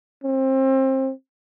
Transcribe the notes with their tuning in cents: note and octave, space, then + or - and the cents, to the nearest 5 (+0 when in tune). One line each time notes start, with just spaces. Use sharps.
C4 +25